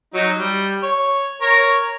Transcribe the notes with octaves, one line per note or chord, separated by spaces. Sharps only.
F#3 D#4
G3
C#5
A#4 C#5